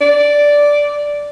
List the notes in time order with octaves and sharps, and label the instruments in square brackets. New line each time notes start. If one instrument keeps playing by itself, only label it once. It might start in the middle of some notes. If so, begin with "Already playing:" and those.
[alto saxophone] D5